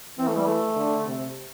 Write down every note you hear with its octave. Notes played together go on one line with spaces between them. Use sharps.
E3 C4
A3
G3
A3
D3
C3